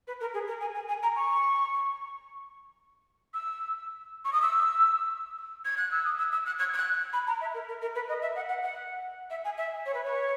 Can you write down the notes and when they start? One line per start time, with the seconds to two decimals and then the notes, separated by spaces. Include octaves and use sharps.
0.07 B4
0.20 A#4
0.34 G#4
0.47 A#4
0.61 G#5
0.74 G#5
0.88 G#5
1.03 A#5
1.16 C#6
3.34 E6
4.25 C#6
4.33 D#6
4.42 E6
5.65 G#6
5.77 F#6
5.91 E6
6.05 D#6
6.18 E6
6.32 E6
6.46 F#6
6.59 G#6
6.73 G#6
6.78 F#6
7.13 B5
7.27 A#5
7.41 E5
7.54 A#4
7.68 A#4
7.81 A#4
7.95 B4
8.09 D#5
8.22 E5
8.36 F#5
8.49 F#5
8.63 F#5
9.30 E5
9.45 G#5
9.58 E5
9.86 C#5
9.94 B4
10.04 C#5